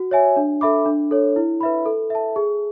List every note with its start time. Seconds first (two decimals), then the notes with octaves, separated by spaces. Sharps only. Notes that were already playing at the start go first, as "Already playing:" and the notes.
Already playing: F#4
0.11 C#5 E5 G#5
0.36 D4
0.61 A4 E5 B5 D6
0.86 D4
1.11 A4 C#5
1.36 E4
1.61 B4 E5 B5
1.86 A4
2.10 E5 A5
2.36 G#4